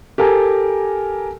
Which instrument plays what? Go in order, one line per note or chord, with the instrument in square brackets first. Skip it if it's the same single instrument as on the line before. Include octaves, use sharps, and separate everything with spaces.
[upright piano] G4 A4 A#4 G#5